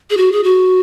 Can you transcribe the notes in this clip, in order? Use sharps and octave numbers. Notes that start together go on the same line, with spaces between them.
G#4
F#4
G#4
F#4